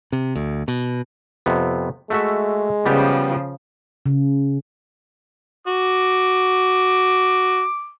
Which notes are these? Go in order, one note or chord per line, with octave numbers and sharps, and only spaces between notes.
C3
D2
B2
F2 C3 B3
G#3 A3 F#4 E5
C#3 F3 G3 B3 G4
C#3
F#4 D6